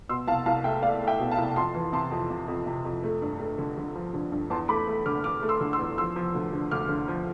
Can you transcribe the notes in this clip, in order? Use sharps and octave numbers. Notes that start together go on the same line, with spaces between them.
B2 C6 E6
C2 F5 A5
C2 F5 A5
A3 E5 G5
A3 D5 F5
A3
E5 G5
B2
F5 A5
C2
F2 A5 C6
E3
C3 A5 C6
F2
C3
F2
C3
F2
A3
G2
A3
D3
D3
F3
D3
G2
E2 A5 C6
A3 B5 D6
A3
D3 D6 F6
D3 D6 F6
A3
C6 E6
D3
C6 E6
E2
F3 C6 E6
F3
D2
D3
D2 D6 F6
D3
F3